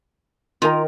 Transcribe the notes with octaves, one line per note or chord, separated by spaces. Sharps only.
D#3 F4 A#4 A#5